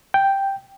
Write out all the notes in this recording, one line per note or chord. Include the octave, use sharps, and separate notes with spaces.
G5